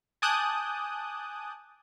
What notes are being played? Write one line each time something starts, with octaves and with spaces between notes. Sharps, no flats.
G#5 A5 D6 D#6 F#6 G6